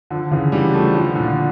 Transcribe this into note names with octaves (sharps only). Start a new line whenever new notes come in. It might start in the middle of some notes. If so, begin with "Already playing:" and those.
D3 F3
C#3 E3
E3 G3
F3 A3
D3 F3
A#2 D3